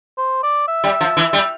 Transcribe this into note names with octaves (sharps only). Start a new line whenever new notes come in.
C5
D5
E5
G3
F3
E3
G3